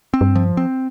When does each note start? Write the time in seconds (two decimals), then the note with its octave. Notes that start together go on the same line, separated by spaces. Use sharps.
0.14 C4
0.21 G2
0.35 F3
0.57 C4